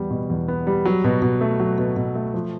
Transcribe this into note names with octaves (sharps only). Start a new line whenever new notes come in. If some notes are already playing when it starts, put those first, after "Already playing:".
Already playing: E2 G3 B3
B2
E2
B3
G3
F#3
B2
B2
A3
F#3
B2
B2
A3
F3